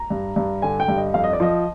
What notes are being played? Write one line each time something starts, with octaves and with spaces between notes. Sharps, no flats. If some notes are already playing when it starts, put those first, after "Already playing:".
Already playing: A#5
G2
G2
D3 G#5
G5
G2
D#5
F2 F5
D#5
D5
F3 D#5